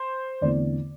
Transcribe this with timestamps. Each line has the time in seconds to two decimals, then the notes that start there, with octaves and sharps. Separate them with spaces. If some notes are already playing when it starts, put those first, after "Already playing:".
Already playing: C5
0.41 E2 D3 A3 C4 E4 D5